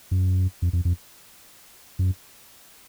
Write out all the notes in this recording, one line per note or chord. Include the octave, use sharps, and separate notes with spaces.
F#2
F2
F2
F2
F#2